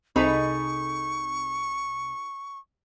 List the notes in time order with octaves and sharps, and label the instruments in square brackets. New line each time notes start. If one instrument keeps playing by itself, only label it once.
[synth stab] C2 C3 B5 [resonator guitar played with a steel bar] D#4 G#4 A4 [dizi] C#6